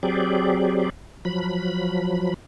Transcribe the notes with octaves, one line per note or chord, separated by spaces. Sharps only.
F#3 C4 G4 G#4 D5
F3 F#3 B5